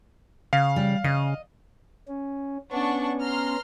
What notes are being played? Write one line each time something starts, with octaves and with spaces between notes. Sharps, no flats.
C#3 F5
G3
C#3 D#5
C#4
B3 C#4 D4 F#5 C#6
A#5 C6 F6